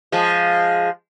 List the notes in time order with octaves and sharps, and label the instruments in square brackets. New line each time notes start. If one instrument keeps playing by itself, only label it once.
[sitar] F3 G#3